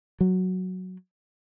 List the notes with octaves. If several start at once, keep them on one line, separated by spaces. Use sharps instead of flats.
F#3